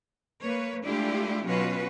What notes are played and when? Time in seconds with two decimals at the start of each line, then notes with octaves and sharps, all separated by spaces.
0.42 A#3 B4 C#5
0.84 G#3 A3 D4 E4 F4 G4
1.44 B2 F#3 C#4 F4 F#4 B4